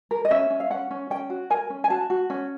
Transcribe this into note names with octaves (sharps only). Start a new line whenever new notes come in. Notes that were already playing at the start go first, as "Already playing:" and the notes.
A#4
D#5
C#4 E5
C#4
F5
C#4 F#5
C#4
C#4 G5
F#4
A#4 G#5
C#4
G#5
F#4 A5
F#4
C#4